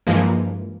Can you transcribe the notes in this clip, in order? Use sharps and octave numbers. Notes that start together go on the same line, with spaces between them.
G2 E3 F3 G#3 A#3